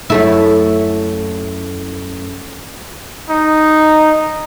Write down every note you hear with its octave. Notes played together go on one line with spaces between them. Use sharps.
F#2 A3 E4
D#4